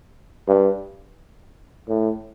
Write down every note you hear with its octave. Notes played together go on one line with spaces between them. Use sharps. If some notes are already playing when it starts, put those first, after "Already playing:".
G2
A2